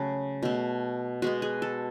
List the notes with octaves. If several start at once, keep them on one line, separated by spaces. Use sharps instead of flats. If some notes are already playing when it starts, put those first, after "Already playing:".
Already playing: C#3 F#3 A3
B2 A3
B2 G#3 B3 F#4
G#4
A4